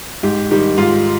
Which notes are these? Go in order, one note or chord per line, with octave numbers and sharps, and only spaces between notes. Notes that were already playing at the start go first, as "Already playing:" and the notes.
G#2 G4
D#3 G3 G4
G#2 F4